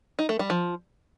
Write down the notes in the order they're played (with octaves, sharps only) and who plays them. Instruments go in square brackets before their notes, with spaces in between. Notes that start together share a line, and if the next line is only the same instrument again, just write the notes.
[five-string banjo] D#4
A3
G3
F3